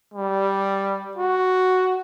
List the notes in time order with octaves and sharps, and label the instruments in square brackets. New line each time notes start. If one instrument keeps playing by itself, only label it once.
[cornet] G3
F#4